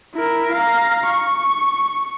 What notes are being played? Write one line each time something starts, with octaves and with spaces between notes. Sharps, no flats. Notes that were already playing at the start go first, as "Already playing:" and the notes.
E4 A#4
F5 A#5
C#6